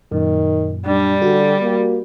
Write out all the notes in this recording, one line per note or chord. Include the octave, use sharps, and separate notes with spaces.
F#2 A#2 D#3
G3 D4
D3 F#4 G4
A#3